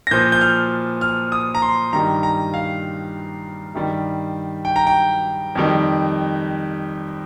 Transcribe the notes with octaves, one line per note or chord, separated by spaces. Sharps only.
A#6
A#2 F3 G6
G6
F6
F6
D#6
A#5
C6
G2 D#3 G3 A#5
A#5
F5
G2 D#3 G3
G5
A#5
G5
F2 D#3 G3